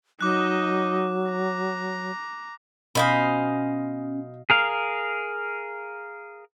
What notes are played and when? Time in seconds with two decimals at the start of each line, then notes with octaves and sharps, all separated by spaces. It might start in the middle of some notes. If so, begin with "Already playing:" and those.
0.21 F#3 D#4 D#5 D6 F#6
1.30 A#5
2.95 B2 C#4 C5 D#5 F5 G#5 B5
4.50 G#4 A#4 F5